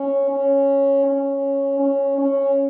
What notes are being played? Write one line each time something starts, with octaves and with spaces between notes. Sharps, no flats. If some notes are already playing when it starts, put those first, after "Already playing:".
Already playing: C#4
C#4
C#4
C#4
C#4